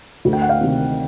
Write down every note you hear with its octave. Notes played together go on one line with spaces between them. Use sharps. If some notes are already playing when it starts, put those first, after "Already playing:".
D2
G5
F#5
F5 G5
C3 D#3